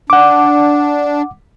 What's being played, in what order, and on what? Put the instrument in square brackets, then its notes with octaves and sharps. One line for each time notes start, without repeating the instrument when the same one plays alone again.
[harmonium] D4 [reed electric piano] F#5 D6